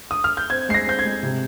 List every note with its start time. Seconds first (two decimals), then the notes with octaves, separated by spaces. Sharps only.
0.11 D#6
0.24 F6
0.37 G6
0.50 C4 G#6
0.69 G#3 C7
0.74 A#6
0.87 C4 G6
0.99 G#6
1.05 G#3
1.23 C3